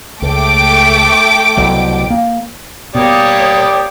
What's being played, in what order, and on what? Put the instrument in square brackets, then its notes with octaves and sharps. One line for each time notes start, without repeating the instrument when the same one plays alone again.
[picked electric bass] C#2 [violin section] A3 G5 D6
[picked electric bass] C2 B2 F#3
A#3
[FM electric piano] B2 [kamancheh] A#3 C#5 [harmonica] G4 D5 [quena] D#6